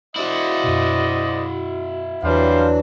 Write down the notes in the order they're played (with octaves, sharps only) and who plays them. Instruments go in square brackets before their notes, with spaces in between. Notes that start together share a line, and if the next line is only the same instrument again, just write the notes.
[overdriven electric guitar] E4 F#4 [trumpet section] C5 D5 D#5
[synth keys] F#2 B2
[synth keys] E2 [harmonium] E3 F#3 D4 [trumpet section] G3 C5 F5